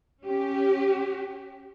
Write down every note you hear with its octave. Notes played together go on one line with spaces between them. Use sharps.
C#4 G4